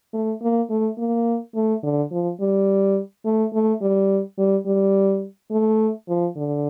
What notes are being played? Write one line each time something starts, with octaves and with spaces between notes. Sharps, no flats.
A3
A#3
A3
A#3
A3
D3
F3
G3
A3
A3
G3
G3
G3
A3
F3
D3